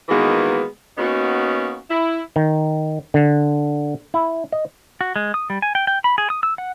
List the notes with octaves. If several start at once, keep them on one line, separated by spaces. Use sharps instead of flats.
D#3 E3 G#3 A#3 B3 F#4
A#3 B3 C#4 D#4 F#4
E4
D#3
D3
E4
D#5
F#4
G#3
D#6
G3
G#5
G5
G5
B5
G#4
D#6
E6
F#5